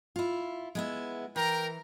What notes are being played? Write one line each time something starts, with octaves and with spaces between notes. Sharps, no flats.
E4 F4
G#3 B3 E4
E3 A#4 G5 A#5